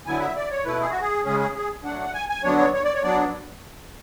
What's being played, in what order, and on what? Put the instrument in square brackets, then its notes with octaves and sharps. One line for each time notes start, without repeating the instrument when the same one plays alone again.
[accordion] D3 F#3 B3 E4 G#5
E5
D5
C#5
B2 A3 E4 B4
G#4
F#4
G#4
C#3 G#3 C#4 G#4
G#4
G#4
F#3 A3 D4 F#5
G#5
G#5
D3 F#3 B3 D4 C#5
C#5
C#5
D5
C#5
F#3 B3 D4 D5